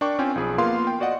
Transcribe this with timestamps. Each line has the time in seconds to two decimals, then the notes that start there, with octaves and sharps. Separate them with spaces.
0.01 D4 A#4 D5 G5 C#6 D6
0.19 C4 C#4 F4 D5 G5 G#5
0.35 B1 F3 G#4 B5
0.58 A#3 B3 F4 A#4 F5 C6
0.87 G5
1.00 F#4 D5 D#5 F#5